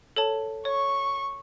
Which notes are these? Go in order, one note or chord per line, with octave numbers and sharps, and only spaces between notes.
A4 C#5 A5
C#5 C#6